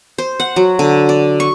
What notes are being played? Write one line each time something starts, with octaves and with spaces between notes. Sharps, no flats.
C5
F#5
F#3
D3
D5
C#6